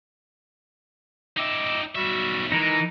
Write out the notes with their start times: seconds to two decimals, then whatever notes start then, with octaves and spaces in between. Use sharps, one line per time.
1.37 D#4 D#5 E5 G5 D6
1.95 B1 G3 F#4 E5
2.52 E3 G#3 D#4 A#4